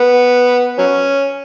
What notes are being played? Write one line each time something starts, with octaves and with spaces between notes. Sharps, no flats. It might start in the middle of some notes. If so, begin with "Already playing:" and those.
Already playing: B3
F#3 C#4